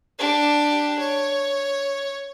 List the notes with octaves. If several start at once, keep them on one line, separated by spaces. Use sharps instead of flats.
D4 G4
C#5